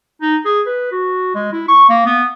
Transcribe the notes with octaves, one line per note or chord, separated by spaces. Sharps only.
D#4
G#4
B4
F#4
G#3
E4
C#6
A#3
B3